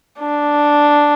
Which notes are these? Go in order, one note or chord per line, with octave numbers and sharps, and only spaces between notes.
D4